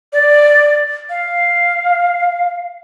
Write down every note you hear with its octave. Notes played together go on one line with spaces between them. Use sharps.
D5
F5